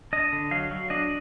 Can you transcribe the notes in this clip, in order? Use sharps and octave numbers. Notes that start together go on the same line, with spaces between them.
D4 D#5
D3
F#3 F5
F#3
D4 D#5